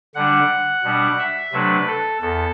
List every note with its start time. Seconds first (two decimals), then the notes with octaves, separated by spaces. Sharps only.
0.15 D3 G3 D4 F#5
0.83 B2 G3 D4
1.18 E5
1.52 C3 F#3 A3 D4 B4
1.87 A4
2.21 E2 A4